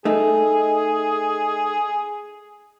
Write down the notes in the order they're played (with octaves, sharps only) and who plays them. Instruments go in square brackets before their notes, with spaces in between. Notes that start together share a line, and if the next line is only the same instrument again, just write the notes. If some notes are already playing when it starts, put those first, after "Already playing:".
[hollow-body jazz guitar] A3 D#4 [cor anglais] G#4